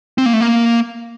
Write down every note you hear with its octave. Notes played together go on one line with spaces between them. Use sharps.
C4
A#3
A3
A#3